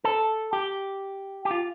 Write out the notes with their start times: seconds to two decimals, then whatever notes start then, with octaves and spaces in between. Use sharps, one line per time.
0.04 A4
0.53 G4
1.45 G4
1.51 F4